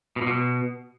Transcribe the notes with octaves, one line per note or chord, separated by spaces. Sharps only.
B2
A#2
B2